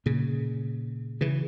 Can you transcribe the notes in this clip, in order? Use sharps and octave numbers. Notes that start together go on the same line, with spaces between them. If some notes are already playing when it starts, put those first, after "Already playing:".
A#2 C#3
C#3 E3